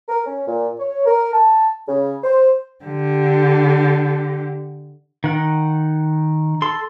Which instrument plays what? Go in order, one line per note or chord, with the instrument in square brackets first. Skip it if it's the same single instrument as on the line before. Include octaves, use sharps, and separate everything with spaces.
[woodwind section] A#4
C#4
A#2
C#5
A#4
A5
C#3
C5
[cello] D3 G4
[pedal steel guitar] D#3 F#5
A4 C6